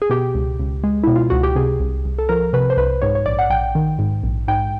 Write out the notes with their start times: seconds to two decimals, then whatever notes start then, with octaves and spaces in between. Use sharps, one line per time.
0.02 G#4
0.10 B2 G4
0.35 C#2
0.59 C#2
0.84 G#3
1.04 B2 E4
1.16 F4
1.30 C#2 F#4
1.43 G4
1.56 C3 G#4
1.80 C2
2.05 C2
2.18 A4
2.29 F3 A#4
2.53 C3 B4
2.70 C5
2.77 C2 B4
3.02 G#2 C#5
3.15 C#5
3.26 A#1 D5
3.39 F#5
3.50 A#1 G5
3.75 D#3
3.99 G#2
4.23 A#1
4.48 G#2 G5